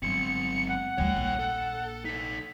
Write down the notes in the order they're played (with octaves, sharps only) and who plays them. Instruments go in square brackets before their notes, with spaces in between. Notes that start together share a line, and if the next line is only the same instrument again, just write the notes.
[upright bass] G1 F#3 [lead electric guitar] G#3 C4 [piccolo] C#7
[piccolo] F#5
[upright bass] D2 G3 [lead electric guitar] C#5 G5
[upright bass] A#1
[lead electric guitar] A4
[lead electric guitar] D#4 A4 [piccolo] B6